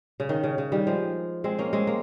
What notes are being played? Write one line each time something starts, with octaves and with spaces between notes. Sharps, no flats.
C#3
D#3
C#3
C#3
D#3 G3
F3 G#3
G#3 C4
A#3 C#4
G#3 C4
A#3